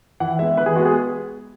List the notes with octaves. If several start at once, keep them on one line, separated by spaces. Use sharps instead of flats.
E3 F#5
G#3 B3 E5
E3 B4
G#4
G#3 B3 F#4
G#4